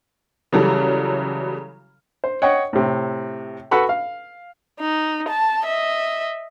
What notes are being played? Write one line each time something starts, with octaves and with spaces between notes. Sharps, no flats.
C#3 E3 F#3 G3 A4
C5
C#5 D#5 F#5 G5 C#6
A2 C3
F#4 A4 B4 F#5 B5 C#6
F5
D#4
A5
D#5 E5